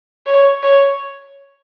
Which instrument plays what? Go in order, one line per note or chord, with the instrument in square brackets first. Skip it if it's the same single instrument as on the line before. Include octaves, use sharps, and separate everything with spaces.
[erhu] C#5
C#5